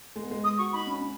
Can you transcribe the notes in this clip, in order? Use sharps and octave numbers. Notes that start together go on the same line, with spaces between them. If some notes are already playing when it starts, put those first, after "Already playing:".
G#3
B3
G#3
D#6
F#4 C#6
D#4 B5
C#4
C#4